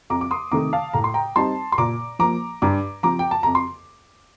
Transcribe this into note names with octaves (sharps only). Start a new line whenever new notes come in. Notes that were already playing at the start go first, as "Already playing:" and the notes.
F2 A#5 D6
D6
C6 D#6
C3 D#3 A3 A#5 D6
F5 A5
A2 A#5
C6
G5 A#5
G3 C4 D#4 A5 C6
C6
A#2 A#5 D6
F3 A#3 A#5 D6
G2 A#5 D6
F3 C4 A#5 D6
G5
A5
F2 A#5
C6